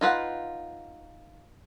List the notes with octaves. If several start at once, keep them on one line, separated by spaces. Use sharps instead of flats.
D#4 F4 B4 F#5